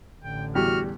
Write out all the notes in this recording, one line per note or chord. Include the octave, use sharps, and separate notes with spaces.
A1 D3 G5
E2 G3 F#4 G4 F6